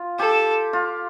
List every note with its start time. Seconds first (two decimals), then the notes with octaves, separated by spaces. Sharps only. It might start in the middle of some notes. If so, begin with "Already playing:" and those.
Already playing: F4
0.19 G4 A4
0.73 F4